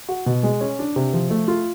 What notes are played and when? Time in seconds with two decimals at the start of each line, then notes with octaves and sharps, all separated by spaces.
0.09 F#4
0.26 B2
0.43 G#3
0.61 C#4
0.79 D4
0.96 C3
1.13 F3
1.30 A3
1.48 F4